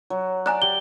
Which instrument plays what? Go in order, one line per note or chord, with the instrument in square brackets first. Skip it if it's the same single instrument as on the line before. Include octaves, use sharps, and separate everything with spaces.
[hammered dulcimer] F#3
[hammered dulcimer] D5 [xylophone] G#5 A#5 F#6
[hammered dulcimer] G4 [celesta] G7